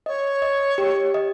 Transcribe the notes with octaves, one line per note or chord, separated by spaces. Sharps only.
C#5 D#5
D#5
G4
D#5